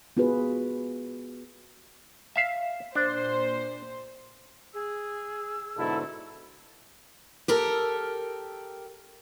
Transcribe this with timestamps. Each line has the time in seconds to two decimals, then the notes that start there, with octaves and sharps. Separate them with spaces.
0.17 B3 F4 F#4 G#4 B4
2.36 E5 F5
2.95 A#2 D4 C5
4.74 G#4 E6
5.77 G#2 B2 D3 E4 A4
7.48 G4 A4 A#4